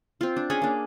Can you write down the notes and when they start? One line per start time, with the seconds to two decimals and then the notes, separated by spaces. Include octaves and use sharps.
0.21 C4 F4
0.37 D4
0.50 C#4 G#4 C#5 G#5
0.62 A#3 D4